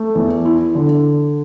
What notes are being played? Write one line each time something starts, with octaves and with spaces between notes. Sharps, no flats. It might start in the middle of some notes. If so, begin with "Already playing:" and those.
Already playing: A3
E2
E4
D3